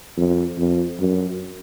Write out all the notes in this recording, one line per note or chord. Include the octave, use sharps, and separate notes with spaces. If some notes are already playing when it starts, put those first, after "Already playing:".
F2
F2
F#2